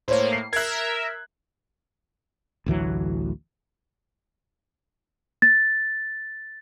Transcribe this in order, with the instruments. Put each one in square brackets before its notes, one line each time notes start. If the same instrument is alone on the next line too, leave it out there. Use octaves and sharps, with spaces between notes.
[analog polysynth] A2 A#3 [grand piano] C5 C#5
[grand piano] C7
[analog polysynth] A#4 E5 [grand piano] F#6 G#6
[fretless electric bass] A1 D2 E3 F#3
[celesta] A6